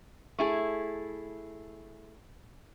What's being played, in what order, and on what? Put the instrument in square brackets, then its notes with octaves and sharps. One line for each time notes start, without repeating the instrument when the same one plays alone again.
[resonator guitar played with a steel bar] A3 E4 G#4